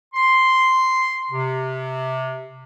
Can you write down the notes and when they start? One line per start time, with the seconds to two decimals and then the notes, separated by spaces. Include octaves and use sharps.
0.14 C6
1.30 C3